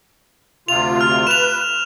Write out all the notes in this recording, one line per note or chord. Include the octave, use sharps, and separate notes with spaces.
D2 C3 F4 F7
F6
B4 E7 F7